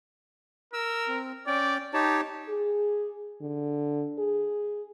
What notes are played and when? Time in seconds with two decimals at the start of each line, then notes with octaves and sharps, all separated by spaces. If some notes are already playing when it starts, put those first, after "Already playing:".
0.74 A#4 E6
1.08 C4
1.47 C#4 D5 G5
1.94 D#4 G4 C#5 A5
2.49 G#4
3.41 D3
4.19 G#4